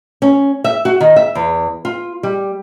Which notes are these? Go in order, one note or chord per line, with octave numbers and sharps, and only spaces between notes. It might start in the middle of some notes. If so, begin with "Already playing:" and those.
C#4
E5
F#4
D#3
E5
E2
F4
G3